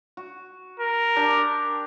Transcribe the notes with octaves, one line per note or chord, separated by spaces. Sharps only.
F#4
A#4
D4 G4